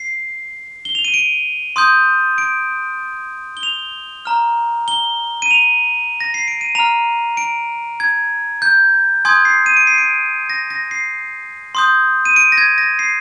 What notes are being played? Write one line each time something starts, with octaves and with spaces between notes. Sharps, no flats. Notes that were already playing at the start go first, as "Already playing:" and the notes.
Already playing: C7
G7
F7
D#7
D7
C6 D#6 G6
D7
G7
F7
A#5 F6
G7
D#7
F7
A#6
C7
D7
D#7
A#5 F6 F7
D7
G#6
G6
G#5 C6 D#6 G6 G#6
C7
D#7
D7
C7
D7
A#6
A#6
C7
C6 D#6 G6
D#7
D7
A#6
G#6
A#6
C7